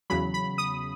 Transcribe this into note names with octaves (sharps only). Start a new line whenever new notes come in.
E2 C#3 F#3 B5
B5
D#6